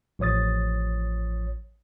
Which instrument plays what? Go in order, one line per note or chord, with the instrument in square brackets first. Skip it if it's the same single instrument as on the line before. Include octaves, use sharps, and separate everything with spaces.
[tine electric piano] A1 F3 C#5 D#6 A6